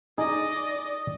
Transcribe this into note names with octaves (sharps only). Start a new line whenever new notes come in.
D#4 G#4 D5 D#5